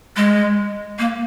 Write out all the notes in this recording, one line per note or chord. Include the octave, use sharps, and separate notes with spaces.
G#3
A#3